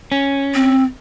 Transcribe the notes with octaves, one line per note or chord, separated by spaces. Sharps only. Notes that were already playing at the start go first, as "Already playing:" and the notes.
C#4
C4